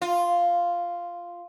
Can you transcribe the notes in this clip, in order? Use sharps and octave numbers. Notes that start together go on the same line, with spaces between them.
F4